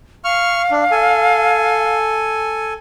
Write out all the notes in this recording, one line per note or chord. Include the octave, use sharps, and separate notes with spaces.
F5 C#6 F6
D4
A4 G#5